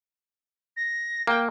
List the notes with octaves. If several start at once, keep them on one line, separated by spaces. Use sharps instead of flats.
A#6
A#3 G5